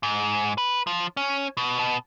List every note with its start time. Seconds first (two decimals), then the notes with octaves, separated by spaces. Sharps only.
0.03 G#2
0.58 B4
0.87 F3
1.17 C#4
1.57 B2
1.79 B2